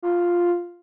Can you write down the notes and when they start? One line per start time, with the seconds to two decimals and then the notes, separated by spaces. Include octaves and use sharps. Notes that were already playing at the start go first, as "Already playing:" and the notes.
0.02 F4